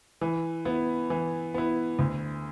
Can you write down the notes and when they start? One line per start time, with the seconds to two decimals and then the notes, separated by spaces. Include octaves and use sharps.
0.21 E3
0.65 B3 E4
1.10 E3
1.54 B3 E4
1.99 D2